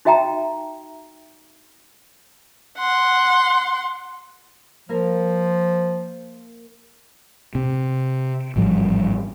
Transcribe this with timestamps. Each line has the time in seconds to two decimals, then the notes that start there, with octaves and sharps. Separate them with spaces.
0.05 D#4 F#4 E5 G5 A5 A#5
2.78 F#5 C6
4.89 F3 A#3 A#4
7.55 C3
8.56 A1 G#2 F3 G3